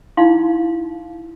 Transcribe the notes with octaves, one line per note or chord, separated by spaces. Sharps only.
D#4 E4 F5 C6